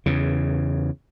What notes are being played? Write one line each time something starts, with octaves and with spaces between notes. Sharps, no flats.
E2 C#3